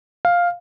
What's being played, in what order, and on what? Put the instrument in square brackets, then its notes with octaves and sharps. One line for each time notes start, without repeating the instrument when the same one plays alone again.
[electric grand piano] F5